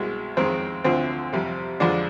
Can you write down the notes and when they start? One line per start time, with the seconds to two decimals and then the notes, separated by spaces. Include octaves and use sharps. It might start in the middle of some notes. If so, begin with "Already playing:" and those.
Already playing: C2 B2 G#3
0.37 F2 D#3 G#3 C4
0.84 D2 D3 F3 C4
1.33 F2 C3 G3
1.80 F2 D3 F3 G#3 D4